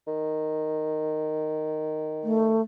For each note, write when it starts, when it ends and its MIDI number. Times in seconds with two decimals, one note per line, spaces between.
0.07 2.58 51
2.24 2.62 57